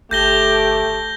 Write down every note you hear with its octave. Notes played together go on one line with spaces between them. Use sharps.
G1 A3 G4 G6 A#6 G7